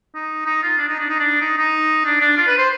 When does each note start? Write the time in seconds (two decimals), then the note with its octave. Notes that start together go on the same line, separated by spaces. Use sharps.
0.15 D#4
0.46 D#4
0.62 F4
0.78 D4
0.88 D#4
0.99 D4
1.09 D#4
1.19 D4
1.41 D#4
1.58 D#4
2.05 D4
2.21 D4
2.37 F4
2.47 B4
2.58 C5